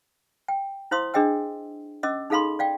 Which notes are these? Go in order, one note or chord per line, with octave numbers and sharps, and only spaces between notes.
G5
E4 C5 F5 C6 D#6
D4 G#4 D#5 G5 E6
C#4 D#5 D6 E6
D#4 G#4 A4 F5 B5 C6
D5 F5 G5